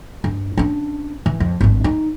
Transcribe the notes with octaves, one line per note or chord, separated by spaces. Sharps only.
G2
C#4 D4
E3
F2
G#1 G2
D#4